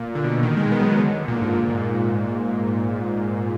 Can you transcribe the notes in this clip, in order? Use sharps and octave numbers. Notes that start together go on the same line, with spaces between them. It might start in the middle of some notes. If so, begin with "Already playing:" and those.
Already playing: A#2
D3
B2
D3
D#3
G#3
B3
F#3
D#3
D3
A#2
G#2
A#2
G#2
A#2